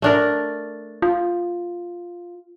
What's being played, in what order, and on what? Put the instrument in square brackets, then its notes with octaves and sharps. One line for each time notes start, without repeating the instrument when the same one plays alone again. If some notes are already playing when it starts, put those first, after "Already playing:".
[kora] A3 D4 A#4
[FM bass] F4